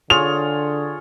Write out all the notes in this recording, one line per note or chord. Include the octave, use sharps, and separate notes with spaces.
D3 F4 G#4 C#5 F7